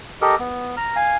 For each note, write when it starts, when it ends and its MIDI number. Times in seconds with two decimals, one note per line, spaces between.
0.22 0.35 67
0.22 0.35 69
0.22 0.35 70
0.22 0.35 75
0.40 0.75 59
0.77 0.96 82
0.77 0.96 89
0.96 1.17 77
0.96 1.17 80